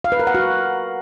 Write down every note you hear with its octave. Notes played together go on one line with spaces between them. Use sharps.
F5
B4
A#4
F#5
F#4